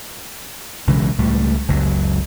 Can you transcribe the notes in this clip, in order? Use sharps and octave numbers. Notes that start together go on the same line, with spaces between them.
B1 C#3 E3 G#3
C#2 A2 G3
F#1 C#2 F#3